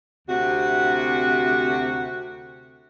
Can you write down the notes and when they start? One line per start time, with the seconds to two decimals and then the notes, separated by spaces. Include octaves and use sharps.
0.28 D2 C3 F#4